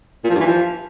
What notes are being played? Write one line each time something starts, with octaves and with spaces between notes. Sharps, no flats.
A#2
F3
G2
E3
F3